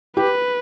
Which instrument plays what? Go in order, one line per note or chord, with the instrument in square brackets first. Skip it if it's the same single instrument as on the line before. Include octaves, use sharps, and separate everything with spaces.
[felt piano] G4 [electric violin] B4